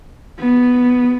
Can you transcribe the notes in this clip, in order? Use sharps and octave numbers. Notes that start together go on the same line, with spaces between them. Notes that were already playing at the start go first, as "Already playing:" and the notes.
B3